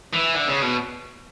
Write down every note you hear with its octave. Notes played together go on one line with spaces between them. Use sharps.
E3
D3
C#3
B2